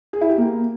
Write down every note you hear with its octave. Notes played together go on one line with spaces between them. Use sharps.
G#4
E4
G4
A#3